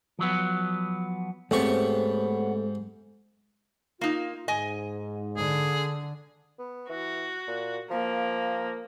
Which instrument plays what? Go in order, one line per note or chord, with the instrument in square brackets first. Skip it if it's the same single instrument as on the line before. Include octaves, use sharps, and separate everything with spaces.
[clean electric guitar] F3 F#3 B3
[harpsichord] G#2 G4 C#6 [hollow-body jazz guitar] A3 C4 [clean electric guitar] B3 C#5
[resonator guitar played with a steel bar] A#3 D#4 [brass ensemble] F4
[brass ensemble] G#2 [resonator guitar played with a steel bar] D#5 G#5
[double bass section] D3 [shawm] G#4
[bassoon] B3
[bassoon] E3 [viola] F#4
[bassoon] A#2
[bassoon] F3 [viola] A#3